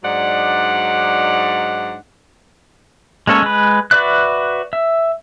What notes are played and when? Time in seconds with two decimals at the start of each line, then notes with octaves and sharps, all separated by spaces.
0.03 G#2 F#3 D4 D#4 D5 F#5
3.27 G#3 A#3 C#4 A4 C#5
3.43 G#3 B4
3.91 F#4 B4 D5 E5 F#6
4.73 E5